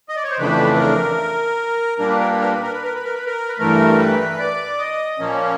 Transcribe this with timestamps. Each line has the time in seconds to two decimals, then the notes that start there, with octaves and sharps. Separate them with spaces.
0.09 D#5
0.16 D5
0.24 C#5
0.31 C5
0.38 F2 C#3 E3 A3 D4 B4
0.74 B4
0.78 A#4
1.98 A#2 G3 A#3 D4 A#4
2.08 B4
2.20 A#4
2.30 B4
2.41 A#4
2.51 B4
2.62 A#4
2.72 B4
2.83 A#4
2.94 B4
3.04 A#4
3.14 B4
3.26 A#4
3.49 B4
3.59 G2 E3 A3 A#4
3.99 B4
4.39 D5
4.78 D#5
5.19 A#2 F3 A#3 C#4